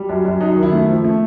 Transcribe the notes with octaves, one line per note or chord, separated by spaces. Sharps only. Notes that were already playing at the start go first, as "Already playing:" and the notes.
Already playing: G3
F#2
F#2
F#2 D#4
D#4
D#3
E4
A3
F3
A3